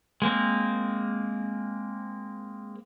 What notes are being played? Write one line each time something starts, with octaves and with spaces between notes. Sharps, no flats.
G#3 A#3 C4